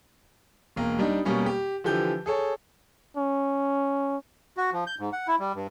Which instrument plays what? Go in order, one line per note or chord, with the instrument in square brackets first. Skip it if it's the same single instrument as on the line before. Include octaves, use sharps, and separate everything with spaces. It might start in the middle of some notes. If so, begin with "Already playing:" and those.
[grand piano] E1 A#3
G3 D4 D#4
B2 G3 A#3 C#4
G4
D3 E3 F3 G4 G6
G#4 A4 C#5
[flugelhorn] C#4
[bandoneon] F#4
F3
G6
G#2
F#5
E4
G3
G2